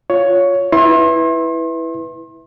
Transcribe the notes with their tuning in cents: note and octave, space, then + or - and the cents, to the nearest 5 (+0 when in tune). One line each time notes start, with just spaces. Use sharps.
F4 +10 C#5 +10
E4 -5 B4 +0 C6 +35